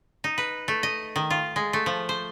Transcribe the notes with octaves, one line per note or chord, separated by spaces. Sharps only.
D#4
B4
A3
D#5
D#3
F4
G#3
A3
F3
C5